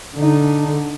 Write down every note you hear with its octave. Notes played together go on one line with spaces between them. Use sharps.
D3 D#4